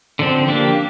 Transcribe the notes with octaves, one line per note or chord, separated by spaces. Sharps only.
D3 F3 C4
A#3 D4 G4